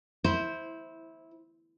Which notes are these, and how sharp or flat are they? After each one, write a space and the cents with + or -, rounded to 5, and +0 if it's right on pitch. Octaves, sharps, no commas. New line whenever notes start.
E4 -15 C5 +0